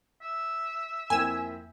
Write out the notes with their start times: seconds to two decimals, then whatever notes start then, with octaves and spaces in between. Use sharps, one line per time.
0.22 E5
1.10 F2 A#3 C4 E4 G#5 E6